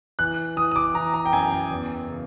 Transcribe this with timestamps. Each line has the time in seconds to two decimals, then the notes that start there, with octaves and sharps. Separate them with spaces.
0.19 E3 F#6
0.56 E3 D#6
0.72 D#6
0.76 D6
0.95 E3 A#5
1.14 A#5
1.26 G5
1.33 F#2 G#5
1.51 G5
1.71 E2
2.09 C#3